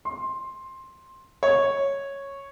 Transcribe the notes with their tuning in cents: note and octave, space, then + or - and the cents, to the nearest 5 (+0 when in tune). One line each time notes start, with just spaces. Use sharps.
C6 +10
C#5 -5